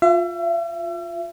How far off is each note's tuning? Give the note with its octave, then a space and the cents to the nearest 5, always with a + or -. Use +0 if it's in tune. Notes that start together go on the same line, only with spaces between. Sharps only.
F4 +10 E5 +40